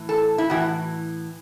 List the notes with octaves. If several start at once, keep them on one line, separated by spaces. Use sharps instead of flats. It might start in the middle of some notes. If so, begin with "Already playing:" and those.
Already playing: A2 E3
A4
E4
A2 E3 F#4